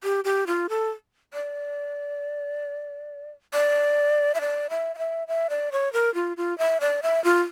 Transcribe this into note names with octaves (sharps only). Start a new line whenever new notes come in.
G4
G4
F4
A4
D5
D5
E5
D5
E5
F5
E5
E5
D5
C#5
A#4
F4
F4
E5
D5
E5
F4